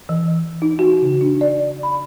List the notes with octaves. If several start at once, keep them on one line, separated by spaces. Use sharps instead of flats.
E3
D#4
F#4
C#3
D4
D5
B5